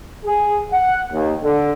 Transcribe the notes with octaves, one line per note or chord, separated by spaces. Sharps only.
G#4
F#5
D#2
D3